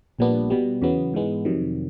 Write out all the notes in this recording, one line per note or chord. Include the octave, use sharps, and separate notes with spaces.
A#1 A#2 G3 B3 D4
B2 G3 B3
E2 C#3 F#3 B3
G#2 E3 G#3 B3
F2 C3 D#3 F#3